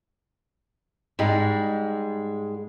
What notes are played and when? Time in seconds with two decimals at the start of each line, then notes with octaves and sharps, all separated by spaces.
1.19 G#2 G3 G#3